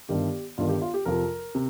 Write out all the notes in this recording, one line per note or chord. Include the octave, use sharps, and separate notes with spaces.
G1 G2 D#3 G4
G1 G2 D#3 F4
G4
F4
G4
F2 C3 F3 A#4
C3